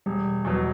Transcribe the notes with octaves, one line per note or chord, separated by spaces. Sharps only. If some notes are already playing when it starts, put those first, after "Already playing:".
E1 G3
E2 B2 F#3 B3